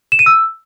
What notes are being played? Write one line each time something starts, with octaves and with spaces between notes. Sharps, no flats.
E7
D#7
E6